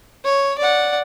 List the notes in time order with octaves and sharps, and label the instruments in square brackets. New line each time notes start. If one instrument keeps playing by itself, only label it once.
[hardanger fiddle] C#5
D5 F#5